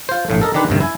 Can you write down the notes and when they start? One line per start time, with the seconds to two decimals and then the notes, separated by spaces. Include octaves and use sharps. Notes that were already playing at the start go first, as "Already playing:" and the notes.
0.09 F4 C5
0.28 A#1 A2 A3
0.41 A4 A#4 D#5
0.54 D#3 D4 G4 B4 C5
0.69 D2 G2 C3 D#3
0.81 E4 G#5